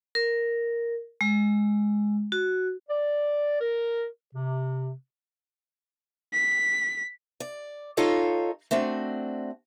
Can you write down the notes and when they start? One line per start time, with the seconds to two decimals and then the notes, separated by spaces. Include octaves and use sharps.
0.15 A#4
1.21 G#3
2.32 F#4
2.89 D5
3.61 A#4
4.34 C3
6.33 B6
7.40 D5
7.97 D#4 F4 A4 C#5 D#5 F5
8.71 A3 C4 D4 F#4